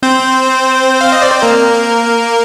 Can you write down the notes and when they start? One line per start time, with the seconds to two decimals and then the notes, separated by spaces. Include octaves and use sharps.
0.03 C4 C5
1.01 F5
1.12 D#5
1.22 D5
1.32 C5
1.42 A#3 A#4